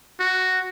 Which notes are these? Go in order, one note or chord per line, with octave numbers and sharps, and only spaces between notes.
F#4